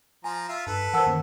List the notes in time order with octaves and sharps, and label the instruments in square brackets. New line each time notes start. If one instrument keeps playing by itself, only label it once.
[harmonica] F3 A#5 [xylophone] G#5
[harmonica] F4 E5
[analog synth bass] G2 [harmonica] A4 B4
[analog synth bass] E3 [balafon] A#4 C5 [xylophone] F#5 A5 E6
[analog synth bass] F#2 [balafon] D#3 A#3 C5